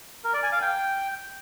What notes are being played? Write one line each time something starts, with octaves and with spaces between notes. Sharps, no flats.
A#4
D5
G#5
F5
G5